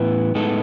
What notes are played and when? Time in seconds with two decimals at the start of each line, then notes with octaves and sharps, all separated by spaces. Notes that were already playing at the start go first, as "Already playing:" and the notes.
Already playing: A2 E3 B3
0.35 A2 G#3 B3 D#4 A4